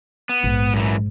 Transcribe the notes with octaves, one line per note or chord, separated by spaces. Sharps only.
B3
A#1 G#2
F#2 E3